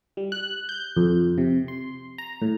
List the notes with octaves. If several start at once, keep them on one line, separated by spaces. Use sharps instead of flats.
G3
F#6
G6
F2
C3
C6
A#5
A2